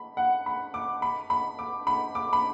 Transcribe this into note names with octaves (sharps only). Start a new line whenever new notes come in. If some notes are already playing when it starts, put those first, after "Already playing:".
Already playing: B5
F#5
B5
D6
B5
B5
D6
B5
D6
B5